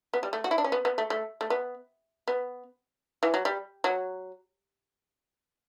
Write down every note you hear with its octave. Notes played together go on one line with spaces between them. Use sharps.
B3
G3
A3
F#4
E4
D4
C#4
B3
B3
A3
A3
A3
B3
B3
E3
F#3
G3
F#3